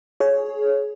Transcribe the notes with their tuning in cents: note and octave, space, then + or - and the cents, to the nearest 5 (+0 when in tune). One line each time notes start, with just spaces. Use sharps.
G#4 +25 C#5 +0